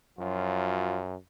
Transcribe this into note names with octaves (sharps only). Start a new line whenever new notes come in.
F#2 F3 F#3 F4